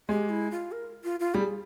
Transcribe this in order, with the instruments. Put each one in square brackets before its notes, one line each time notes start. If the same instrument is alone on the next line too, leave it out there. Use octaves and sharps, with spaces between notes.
[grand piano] G#3 [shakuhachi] G4
[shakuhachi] E4
F4
A#4
F4
F4
[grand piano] G3 [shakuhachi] G#4